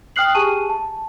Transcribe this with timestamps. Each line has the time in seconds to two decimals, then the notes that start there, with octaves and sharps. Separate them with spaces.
0.16 G5 D#6 F6 F#6 C7 F#7
0.35 G4 G#4 G#5 A5 C#6 D#7
0.69 A5